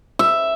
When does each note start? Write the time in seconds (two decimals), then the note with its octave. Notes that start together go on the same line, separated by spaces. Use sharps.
0.19 E5